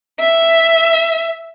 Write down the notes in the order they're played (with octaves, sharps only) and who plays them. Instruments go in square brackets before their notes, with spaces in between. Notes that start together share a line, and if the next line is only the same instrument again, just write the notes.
[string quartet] E5